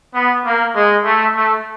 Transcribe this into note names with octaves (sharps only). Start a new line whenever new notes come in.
B3
A#3
G#3
A3
A3